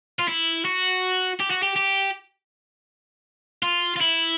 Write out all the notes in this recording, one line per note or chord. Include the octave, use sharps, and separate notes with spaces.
F4
E4
F#4
G4
F#4
G4
G4
F4
F4
E4